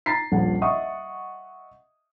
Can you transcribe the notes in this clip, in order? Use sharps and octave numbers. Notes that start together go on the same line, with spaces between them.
A#5 A6 B6 C7
D#1 A#1 F#5
D#5 E5 F#5 C#6 D#6